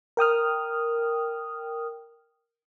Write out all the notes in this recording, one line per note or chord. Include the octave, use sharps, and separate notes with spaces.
A#4 G5 D#6 F6